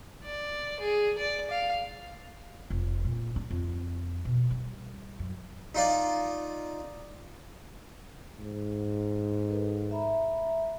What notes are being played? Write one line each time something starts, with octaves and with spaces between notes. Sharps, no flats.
D5
G#4
D5
F5
F1
A#2
D4
F2
B2
G3
F#2
D#4 F4 D5
G#2
A4 B4
E5 A#5 B5